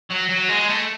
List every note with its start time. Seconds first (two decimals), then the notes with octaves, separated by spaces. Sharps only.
0.11 F#3
0.29 F#3
0.49 G#3
0.69 A3